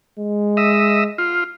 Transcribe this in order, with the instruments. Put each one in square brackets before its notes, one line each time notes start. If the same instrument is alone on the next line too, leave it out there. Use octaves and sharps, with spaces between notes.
[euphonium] G#3
[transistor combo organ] D#5 E5
F4